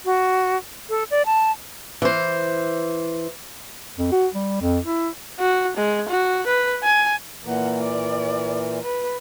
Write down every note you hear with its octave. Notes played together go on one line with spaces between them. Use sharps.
F#4
A4
D5
A5
E3 C5
F2
F#4
G3
F2
E4
F#4
G#3
F#4
B4
G#5
A#2 E3 A#3 F#5
D5
B4